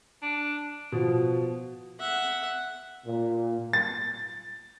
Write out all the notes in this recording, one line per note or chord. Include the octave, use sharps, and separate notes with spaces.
D4
B2 F3
E5 F#5
A#2
A6